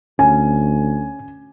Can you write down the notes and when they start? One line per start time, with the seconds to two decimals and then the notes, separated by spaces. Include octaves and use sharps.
0.19 D2 C#4 G#5